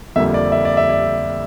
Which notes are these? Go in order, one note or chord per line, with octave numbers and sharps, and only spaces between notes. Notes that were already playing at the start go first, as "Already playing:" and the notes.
F2 D3 G3 A#3 E5
D5
E5
D5
E5
D5